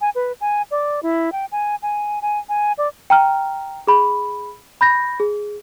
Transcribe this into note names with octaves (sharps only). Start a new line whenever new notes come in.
G#5
B4
G#5
D5
E4
G5
G#5
G#5
G#5
G#5
D5
G5 A#5 F6
G#4 B5
B5 G6 A#6
G#4